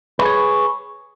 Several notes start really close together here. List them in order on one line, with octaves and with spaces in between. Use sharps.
B4 G#4 C#5